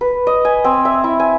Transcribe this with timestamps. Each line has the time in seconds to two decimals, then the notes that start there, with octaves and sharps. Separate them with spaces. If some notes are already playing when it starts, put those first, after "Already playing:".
0.01 B4
0.27 D#5
0.45 G#5
0.64 C4
0.85 E5
1.04 E4
1.20 G#5